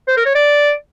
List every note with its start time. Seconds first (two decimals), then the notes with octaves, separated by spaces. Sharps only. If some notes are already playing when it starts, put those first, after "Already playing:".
0.08 C5
0.17 A#4
0.26 C#5
0.35 D5